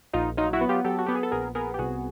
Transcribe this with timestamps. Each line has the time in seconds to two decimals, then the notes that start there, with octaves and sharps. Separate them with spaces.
0.13 A#1 D#4 F4
0.37 F#3 D#4 F4
0.53 E4 F#4
0.61 B3
0.69 F4 G4
0.84 F#3 G4 A4
0.99 F#4
1.06 B3 G4
1.15 G#4
1.23 A4
1.31 A#1 G#4 A#4
1.55 B3 G#4 A#4
1.74 G4
1.79 C2 F#4 G#4